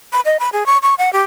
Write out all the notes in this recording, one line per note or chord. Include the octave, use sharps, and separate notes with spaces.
B5
D#5
B5
G#4
C#6
C#6
F#5
G4